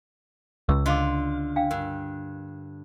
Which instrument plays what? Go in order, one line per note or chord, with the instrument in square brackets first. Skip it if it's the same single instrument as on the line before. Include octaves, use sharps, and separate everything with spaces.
[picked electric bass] C#2 [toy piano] E6
[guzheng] D3 F4 [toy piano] D#5 F5 D6
[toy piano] D4 F5 G5
[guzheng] G2 [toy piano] A#4